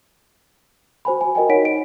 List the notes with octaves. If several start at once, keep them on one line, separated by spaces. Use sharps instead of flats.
F#4 C5 G#5 B5
G#5
F#4 A#4 D#5 G5 G#5
D#4 A#4 C#5 F#5 B6 D7
D7